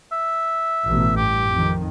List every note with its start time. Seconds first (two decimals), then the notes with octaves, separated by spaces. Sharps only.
0.12 E5
0.86 A1 B2
1.17 G2 G4
1.51 F2 D#3